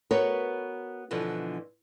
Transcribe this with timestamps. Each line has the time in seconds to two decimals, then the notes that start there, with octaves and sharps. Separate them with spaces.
0.11 B3 F#4 A#4 B4 C#5
1.11 B2 D3 E3 F3